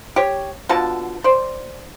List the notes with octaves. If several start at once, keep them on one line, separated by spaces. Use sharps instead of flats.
G4 C#5
B2 D3 F4 A5
C5 D5